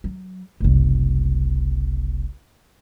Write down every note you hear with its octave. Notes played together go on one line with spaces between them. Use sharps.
F#3
F#1 C2